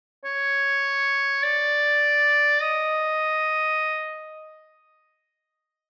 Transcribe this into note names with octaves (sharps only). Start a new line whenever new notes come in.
C#5
D5
D#5